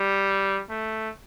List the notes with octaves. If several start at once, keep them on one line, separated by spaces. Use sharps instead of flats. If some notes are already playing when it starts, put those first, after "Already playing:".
Already playing: G3
A3